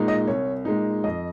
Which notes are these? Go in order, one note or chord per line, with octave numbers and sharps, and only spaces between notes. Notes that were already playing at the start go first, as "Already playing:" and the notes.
Already playing: A#2 G#3 D#4
D#5
C2 C#5
A#2 G#3 D#4
F2 D#5